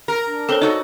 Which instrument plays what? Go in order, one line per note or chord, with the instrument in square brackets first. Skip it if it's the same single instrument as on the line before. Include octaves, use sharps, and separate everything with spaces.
[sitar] A#4
[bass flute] D4
[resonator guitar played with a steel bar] C4 A#5 [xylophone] A4 C5 C#5
[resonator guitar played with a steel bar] D#4 F#4 A4 [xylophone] D#5